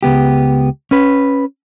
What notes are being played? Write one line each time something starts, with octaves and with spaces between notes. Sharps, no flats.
C#2 B3 G4
C#4 B4